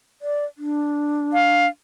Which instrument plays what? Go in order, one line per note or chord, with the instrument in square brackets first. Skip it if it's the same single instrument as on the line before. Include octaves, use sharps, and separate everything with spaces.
[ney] D5
D4
[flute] F5